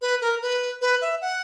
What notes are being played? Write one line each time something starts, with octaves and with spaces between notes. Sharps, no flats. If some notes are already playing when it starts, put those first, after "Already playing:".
B4
A#4
B4
B4
E5
F#5